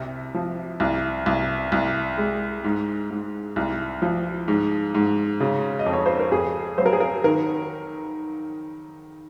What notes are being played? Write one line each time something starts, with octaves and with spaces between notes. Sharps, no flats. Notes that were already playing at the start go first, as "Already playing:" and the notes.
Already playing: C2 C3
F3
C2
C2
C2
G#3
G#2
G#2
C2
F3
G#2
G#2
C#3
D#5
F2
C#5
C5
A#4
F2 G#4
F#3 C5
A#4
G#4
A#4
D#3 A#4